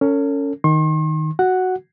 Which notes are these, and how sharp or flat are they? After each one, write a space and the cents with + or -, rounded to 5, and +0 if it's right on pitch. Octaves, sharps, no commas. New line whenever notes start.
C#4 +10 A4 +45
D#3 +0 C6 +45
F#4 +0 F#5 +0